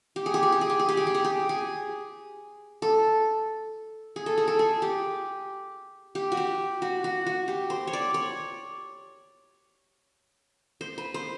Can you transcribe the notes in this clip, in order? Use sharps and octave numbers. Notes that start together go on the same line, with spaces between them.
G4
G#4
G4
G#4
G4
G#4
G4
G#4
G4
G#4
G4
G#4
G4
G#4
A4
G#4
A4
G#4
A4
G#4
G4
G4
F#4
G4
F#4
F#4
F#4
G4
C5
C#5
D5
C#5
C5
B4
C5